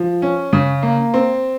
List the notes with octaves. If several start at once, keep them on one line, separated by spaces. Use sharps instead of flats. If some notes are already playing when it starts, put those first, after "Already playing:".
Already playing: F3
C#4
C#3
A#3
C4